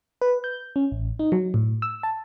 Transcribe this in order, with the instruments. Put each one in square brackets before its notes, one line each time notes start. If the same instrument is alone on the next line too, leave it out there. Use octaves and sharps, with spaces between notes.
[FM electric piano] B4
G6
C#4
A1
D#4
F#3
A2
E6
A5